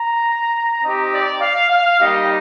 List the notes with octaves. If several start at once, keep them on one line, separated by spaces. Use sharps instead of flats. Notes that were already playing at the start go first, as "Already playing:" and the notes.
Already playing: A#5
C4 D#4 G4 D#5
D5
F5
F5
G3 A#3 D#4 G4 D#5